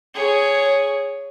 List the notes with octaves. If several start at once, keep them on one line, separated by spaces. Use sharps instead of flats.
G#4 C#5